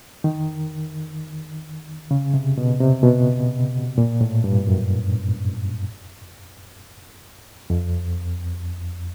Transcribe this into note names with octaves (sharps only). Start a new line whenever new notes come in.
D#3
C#3
C3
B2
C3
B2
A#2
A2
G2
F#2
F2